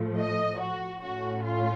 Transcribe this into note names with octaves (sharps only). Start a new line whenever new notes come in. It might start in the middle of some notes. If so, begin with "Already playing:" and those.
Already playing: A2 F3 A3
D#5
F#4
A2 A3 C#4 F#4
F4